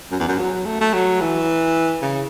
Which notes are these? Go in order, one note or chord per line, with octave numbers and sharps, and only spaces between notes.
F#2
E2
F#2
F#3
A3
A3
F#3
E3
C#3